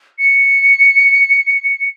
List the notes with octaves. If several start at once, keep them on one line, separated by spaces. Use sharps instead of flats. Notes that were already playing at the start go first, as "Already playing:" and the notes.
C#7